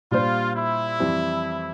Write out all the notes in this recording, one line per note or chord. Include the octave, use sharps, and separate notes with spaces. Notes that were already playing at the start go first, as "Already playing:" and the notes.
A#2 G3 D4 F4 G4 C5
E4
F2 E3 G3 C4